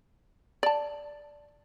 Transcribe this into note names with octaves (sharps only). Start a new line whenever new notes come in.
D5 A5